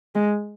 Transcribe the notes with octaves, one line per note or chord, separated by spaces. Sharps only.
G#3